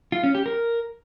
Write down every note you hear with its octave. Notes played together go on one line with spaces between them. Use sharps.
F4
C#4
G4
A#4